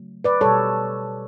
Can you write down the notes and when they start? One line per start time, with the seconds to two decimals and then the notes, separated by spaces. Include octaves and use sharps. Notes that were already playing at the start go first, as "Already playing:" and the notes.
Already playing: C#3 F#3 A3
0.24 B4 D5
0.41 B2 G3 A4 C#5